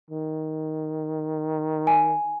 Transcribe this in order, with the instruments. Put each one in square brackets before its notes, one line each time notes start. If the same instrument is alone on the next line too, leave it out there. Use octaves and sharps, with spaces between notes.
[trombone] D#3
[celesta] G#5